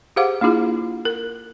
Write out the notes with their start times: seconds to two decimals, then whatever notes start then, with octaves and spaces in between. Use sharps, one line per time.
0.16 G4 G#4 C5 F5 F#5 D6
0.41 A#3 D4 E4 F4 G#4
1.05 A#4